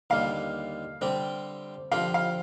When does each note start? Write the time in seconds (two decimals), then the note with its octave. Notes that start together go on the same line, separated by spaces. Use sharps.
0.10 D#2 D3 G3 F5
1.01 D3 G3 C4 G4
1.92 D3 F3 C4 G4 F5
2.14 F5